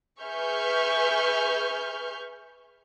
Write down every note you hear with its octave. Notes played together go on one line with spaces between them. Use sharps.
G#4 B4 E5 C#6 F6 G6